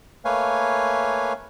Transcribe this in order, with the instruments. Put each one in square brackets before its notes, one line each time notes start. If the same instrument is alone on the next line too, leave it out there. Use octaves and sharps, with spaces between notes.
[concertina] A3 A#3 B4 C#5 F5 G#5